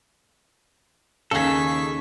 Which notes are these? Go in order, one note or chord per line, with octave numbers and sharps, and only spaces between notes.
D#2 C#3 G#4 A4 C#6 B6